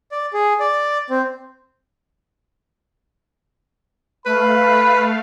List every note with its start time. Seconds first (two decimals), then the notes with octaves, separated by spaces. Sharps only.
0.12 D5
0.33 G#4
0.60 D5
1.10 C4
4.26 A3 B4 F5 B5